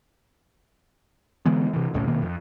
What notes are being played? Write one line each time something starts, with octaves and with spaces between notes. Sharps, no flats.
D3 E3 G#3 B3
C3 E3
D#1 C2 A2 C#3
A#1 B2 D#3 A#3
F2